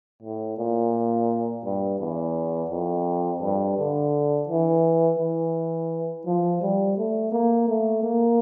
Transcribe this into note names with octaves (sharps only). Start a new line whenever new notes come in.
A2
A#2
G2
E2
F2
G2
D3
E3
E3
F3
G3
A3
A#3
A3
A#3